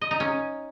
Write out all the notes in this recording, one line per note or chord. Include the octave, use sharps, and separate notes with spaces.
D#5
D#4
C#4